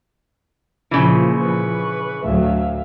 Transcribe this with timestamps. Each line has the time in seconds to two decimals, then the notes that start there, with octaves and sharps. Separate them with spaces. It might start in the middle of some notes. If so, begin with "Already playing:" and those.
0.91 A#2 C#3 E3 F3
1.37 B4 C#6
2.24 D2 A2 F#3 E5 F5